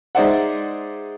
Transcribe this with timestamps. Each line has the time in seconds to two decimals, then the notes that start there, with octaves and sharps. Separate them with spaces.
0.15 G#3 D#4 C5 D5 E5 F#5